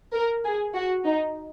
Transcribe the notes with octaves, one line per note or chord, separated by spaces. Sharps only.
A#4
G#4
F#4
D#4